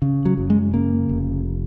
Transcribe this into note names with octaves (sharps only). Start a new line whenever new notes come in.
C#3
F#3
F#1
G#3
C#3 A#3
F1